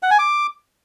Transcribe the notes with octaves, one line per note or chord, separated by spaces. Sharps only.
F#5
G#5
D6